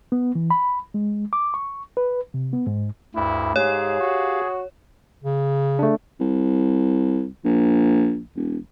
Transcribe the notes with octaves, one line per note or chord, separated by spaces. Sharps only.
B3
E3
B5
G#3
D6
C#6
B4
C3
B3
G#2
D2 G2 E4
G#2 G4 G#4 C#5 F5
F#4
C#3
A3 D4
C2
A#1
E1